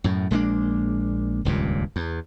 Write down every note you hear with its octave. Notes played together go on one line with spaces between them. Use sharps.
F#2 A2
A#1 G#3 A#3 D4
D#1 C#2 G2 A#2
E2